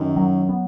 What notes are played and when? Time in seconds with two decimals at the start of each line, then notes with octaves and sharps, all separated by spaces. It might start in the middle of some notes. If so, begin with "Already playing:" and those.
Already playing: F#2 D#3
0.16 F#3
0.49 B3